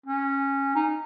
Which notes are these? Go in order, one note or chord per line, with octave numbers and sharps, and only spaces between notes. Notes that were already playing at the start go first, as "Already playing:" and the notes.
C#4
D#4